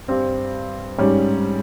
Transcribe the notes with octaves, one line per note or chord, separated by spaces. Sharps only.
G2 G3 C4
G#2 G3 C#4